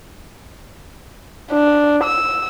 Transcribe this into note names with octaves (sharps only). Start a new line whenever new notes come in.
D4
E6